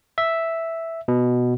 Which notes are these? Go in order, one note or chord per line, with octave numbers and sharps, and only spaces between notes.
E5
B2